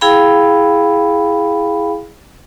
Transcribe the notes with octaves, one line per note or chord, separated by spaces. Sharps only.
E4 G#4 F5 G5 B5